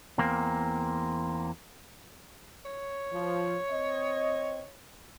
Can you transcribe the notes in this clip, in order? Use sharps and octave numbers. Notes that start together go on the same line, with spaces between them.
E2 A#3 C4
C#5
F3
C4 D#5